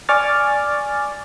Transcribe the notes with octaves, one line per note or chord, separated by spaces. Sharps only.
D5 G#5 C#6 D6 F6 A6